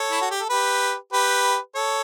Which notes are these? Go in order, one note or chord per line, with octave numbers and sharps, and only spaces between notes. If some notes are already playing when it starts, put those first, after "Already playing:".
Already playing: A4 C#5
E4
F#4
G4
A4
G4 B4
G4 B4
A4 C#5